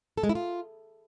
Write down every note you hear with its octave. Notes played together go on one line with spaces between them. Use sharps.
A4
G#3
E4
F4